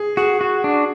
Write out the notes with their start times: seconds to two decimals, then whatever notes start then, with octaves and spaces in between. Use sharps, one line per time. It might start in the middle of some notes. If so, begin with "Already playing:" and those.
Already playing: G#4
0.17 F#4 G#4
0.41 F#4
0.64 D4